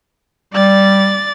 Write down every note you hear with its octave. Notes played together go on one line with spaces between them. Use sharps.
G3 D5 A6